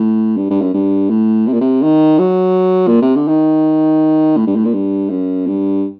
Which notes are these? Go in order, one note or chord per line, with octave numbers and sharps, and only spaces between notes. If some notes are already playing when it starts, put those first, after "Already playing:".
Already playing: A2
G2
G2
F#2
G2
A2
C3
A#2
C3
D#3
F#3
A#2
C3
D3
D#3
A2
G2
A2
A#2
G2
F#2
G2